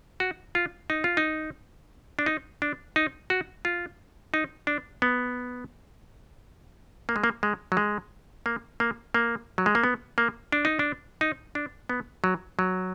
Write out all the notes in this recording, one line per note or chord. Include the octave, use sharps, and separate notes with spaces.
F#4
F4
D#4
F4
D#4
D4
D#4
D4
D#4
F#4
F4
D#4
D4
B3
A#3
G#3
A#3
G#3
F#3
G#3
A#3
A#3
A#3
F#3
G#3
A#3
B3
A#3
D4
D#4
D4
D#4
D4
B3
F#3
F#3